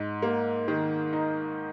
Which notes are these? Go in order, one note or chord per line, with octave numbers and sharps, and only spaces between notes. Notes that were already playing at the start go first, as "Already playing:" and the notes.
Already playing: G#2
A#3
D#3
D#4